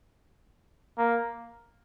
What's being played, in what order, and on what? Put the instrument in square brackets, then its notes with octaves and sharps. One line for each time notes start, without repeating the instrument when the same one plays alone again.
[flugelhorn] A#3